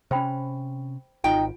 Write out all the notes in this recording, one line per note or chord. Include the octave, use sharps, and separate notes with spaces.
C3 C#4 C5 G5 B5
G#1 D#4 F4 G5